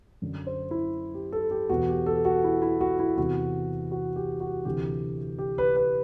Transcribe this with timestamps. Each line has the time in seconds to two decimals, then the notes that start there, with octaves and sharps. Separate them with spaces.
0.22 F#2 D3
0.47 C5
0.71 E4
1.14 G4
1.32 A4
1.51 G4
1.70 E2 B2 F#4
1.89 G4
2.06 A4
2.25 F#4
2.44 E4
2.62 E4
2.81 F#4
2.99 E4
3.17 E2 C3 E3 F#4
3.91 F#4
4.16 G4
4.40 F#4
4.65 D2 C3 E3 G4
5.39 G4
5.58 B4
5.76 B4